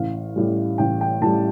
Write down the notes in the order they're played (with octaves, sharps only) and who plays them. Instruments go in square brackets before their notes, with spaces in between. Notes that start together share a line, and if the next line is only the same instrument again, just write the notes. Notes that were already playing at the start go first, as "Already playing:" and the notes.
Already playing: [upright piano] A1 F5
A2 G3
A1 G5
G5
A2 A5
G3